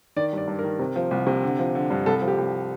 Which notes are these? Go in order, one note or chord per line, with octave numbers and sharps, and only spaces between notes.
D#3 D5
G2 D5
G2
A#4
D#3
C3
F3
C2
C3
D3
F3
D3
G2
C2 A4
F3
G4
C2